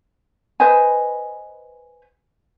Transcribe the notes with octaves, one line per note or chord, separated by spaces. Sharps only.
B4 C5 D#5 G#5